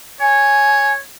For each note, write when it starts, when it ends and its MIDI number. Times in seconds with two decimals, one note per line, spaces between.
0.21 0.98 73
0.21 0.93 80